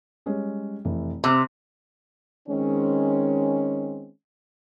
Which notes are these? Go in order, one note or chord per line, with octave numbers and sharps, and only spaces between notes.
G3 G#3 C#4
F1 E3
C3 C6 E6 F#6
D#3 G#3 C4 C#4